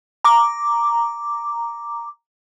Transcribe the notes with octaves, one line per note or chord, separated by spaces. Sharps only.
A#5 D6